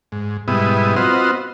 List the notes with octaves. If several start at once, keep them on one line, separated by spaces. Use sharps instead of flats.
G#2
G#2 B2 G3 B3 E4 D#6
B3 C4 F4 F#4 C5 D#5